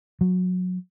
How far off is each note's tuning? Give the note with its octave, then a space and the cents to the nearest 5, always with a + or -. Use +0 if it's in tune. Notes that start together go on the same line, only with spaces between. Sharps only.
F#3 -20